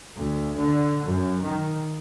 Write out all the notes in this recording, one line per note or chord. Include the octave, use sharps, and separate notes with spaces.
D2
D3
F#2
D#3